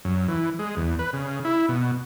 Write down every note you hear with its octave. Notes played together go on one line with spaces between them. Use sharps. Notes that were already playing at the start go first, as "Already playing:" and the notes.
F#2
E3
G#3
E2
B4
C#3
E4
B2